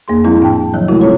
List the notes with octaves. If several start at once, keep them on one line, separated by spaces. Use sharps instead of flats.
F2 A#3 G#4 C6
F3 G3 C4 E4
A2 D4 G5 A5
D#3 F3 F#3
C3 G#3 A3 E4 F#4
C4 C#4 F4 A4 C#5